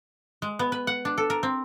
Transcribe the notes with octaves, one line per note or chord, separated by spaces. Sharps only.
G#3
B3
B4
F#5
D4
A4
A#4
C4